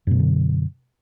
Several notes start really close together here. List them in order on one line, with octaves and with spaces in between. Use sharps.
F#2 B2 F#3 D3